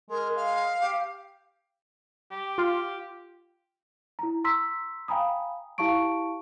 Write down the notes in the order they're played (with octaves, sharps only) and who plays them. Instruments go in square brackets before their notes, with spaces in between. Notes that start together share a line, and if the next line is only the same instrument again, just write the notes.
[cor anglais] G#3 [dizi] A#4
[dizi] F5
[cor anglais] G4
G4
[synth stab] F4
[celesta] E4 A#5
A#5 C6 E6 B6
F5 G5 G#5 A#5 B5 D#6
E4 G4 F5 A5 C#6 D7